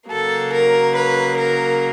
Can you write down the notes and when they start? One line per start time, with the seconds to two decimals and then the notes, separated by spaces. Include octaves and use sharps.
0.10 C#3 F#3 A#3 A4
0.53 A#4
0.95 B4
1.38 A#4